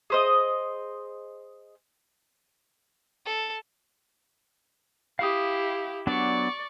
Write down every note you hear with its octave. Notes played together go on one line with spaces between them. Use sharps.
G#4 C5 D#5
A4
E4 G4 F5 D#6
F#3 B3 D4 D5 C#6